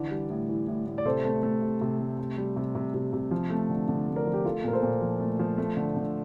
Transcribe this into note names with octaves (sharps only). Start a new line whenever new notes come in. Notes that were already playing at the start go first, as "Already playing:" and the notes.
Already playing: D3 E3 D5
G3
A2
E3
A2
A2
D5
C3 A4 C5
A3
A3
C3
C3
A3
C3
G3
C3
C3
C3
C3
F3
A3
D3
D3
A3
A#4 D5
F3
G4
A3 F4 A4
A#2 A#4
A4 C5
A#2
F3
A3
F3
A3
D3
D3